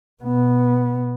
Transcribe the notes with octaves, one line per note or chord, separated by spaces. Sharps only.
B2 B3